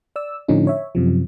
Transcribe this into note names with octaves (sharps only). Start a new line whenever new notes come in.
D5 E6
A2 D3 F3 C#4 D#4
C#5 E5
F#2 C3 F3